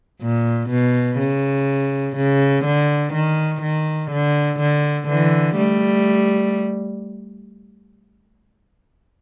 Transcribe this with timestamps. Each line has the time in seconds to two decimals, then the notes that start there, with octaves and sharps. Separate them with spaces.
0.21 A#2
0.70 B2
1.19 C#3
2.16 C#3
2.65 D3
3.13 D#3
3.62 D#3
4.11 D3
4.60 D3
5.08 D3 E3
5.57 G3 A3